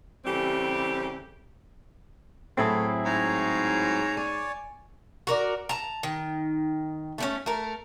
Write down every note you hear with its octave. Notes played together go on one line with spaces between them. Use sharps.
C#3 E3 G3 A3 C4 G4
A2 F#3 A3 C4 E4 G#4
G#2 C#5 A#5
C#5 D5 G#5
F#4 A#4 D5
A5 A#5
D#3
A3 C4 C#4
A3 A#4